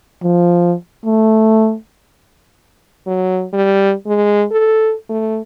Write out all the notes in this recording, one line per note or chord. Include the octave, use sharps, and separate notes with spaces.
F3
A3
F#3
G3
G#3
A4
A3